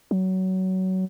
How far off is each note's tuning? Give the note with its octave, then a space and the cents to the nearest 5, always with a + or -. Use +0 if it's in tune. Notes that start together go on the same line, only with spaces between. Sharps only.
F#3 +20